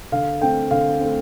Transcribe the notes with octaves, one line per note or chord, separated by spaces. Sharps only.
D3 F5
A3 C4 G5
D3 F5
A3 C4